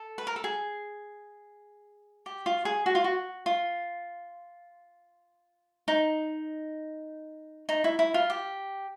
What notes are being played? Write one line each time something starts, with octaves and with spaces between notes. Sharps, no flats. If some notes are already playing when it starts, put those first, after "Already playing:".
Already playing: A4
B4
A#4
A4
G#4
G4
F4
G#4
F#4
F4
F#4
F4
D#4
D#4
E4
E4
F4
G4